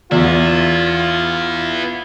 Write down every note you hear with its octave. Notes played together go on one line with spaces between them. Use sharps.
E2 B3 E4 F4